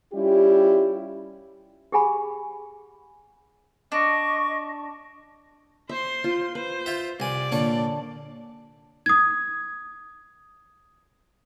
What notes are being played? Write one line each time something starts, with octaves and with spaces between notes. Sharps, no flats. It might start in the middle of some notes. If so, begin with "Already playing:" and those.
G3 C#4 E4 F4 G4
G4 G#4 F#5 G#5 B5
D4 D#5 C#6
C5 E5 C6
F4
B4 C5
F4 E5
C2 D5 G#5
A#2 D3 C#5
D#6 G#6